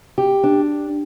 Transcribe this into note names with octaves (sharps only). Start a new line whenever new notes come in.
G4
D4